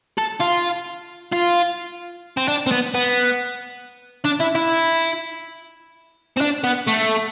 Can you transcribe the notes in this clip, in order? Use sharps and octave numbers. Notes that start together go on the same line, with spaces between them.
A4
F4
F4
C4
D4
C4
B3
B3
D4
E4
E4
C4
D4
B3
A3